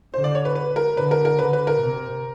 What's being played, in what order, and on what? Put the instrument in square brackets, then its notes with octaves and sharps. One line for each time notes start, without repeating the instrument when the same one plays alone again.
[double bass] D3 [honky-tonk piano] C5
[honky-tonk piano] D5
C#5
B4
B4
A#4
[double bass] D3 [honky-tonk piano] B4
[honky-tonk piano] A#4
A#4
[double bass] D3 [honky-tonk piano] B4
[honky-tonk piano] B4
A#4
[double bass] C3